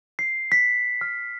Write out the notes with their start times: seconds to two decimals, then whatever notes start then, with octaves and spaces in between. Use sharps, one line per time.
0.19 C7
0.52 B6
1.01 F6